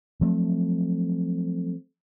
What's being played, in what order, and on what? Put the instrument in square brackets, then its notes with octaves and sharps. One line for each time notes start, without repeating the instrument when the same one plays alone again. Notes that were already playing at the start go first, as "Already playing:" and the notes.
[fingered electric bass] F3 F#3 A3 C4